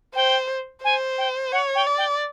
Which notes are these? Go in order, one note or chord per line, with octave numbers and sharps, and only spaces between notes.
C5 G5
C5 G#5
G5
C#5 F#5
G5
D5
G5